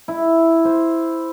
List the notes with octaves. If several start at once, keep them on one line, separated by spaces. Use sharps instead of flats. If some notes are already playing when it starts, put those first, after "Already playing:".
E4
C5